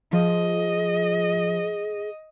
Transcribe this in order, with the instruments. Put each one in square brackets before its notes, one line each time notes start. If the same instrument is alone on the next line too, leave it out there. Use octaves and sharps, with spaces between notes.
[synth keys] F3 [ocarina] G#4 [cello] D#5